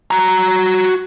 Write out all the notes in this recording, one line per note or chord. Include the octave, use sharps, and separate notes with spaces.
F#4 A#5